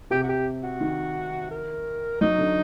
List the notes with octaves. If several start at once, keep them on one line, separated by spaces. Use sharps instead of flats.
C3 G4
F#4
G4
F#4
D#3
A#4
F#3 D#4
D3